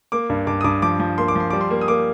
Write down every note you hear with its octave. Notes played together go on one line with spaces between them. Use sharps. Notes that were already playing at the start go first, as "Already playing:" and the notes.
A#3 D6
G2
G2 D6
D#6
G2 D6
F3 D6
F3
A#3 C6
D6
F3 C6
G3 D6
C6
A#3
D#6
A#3 D6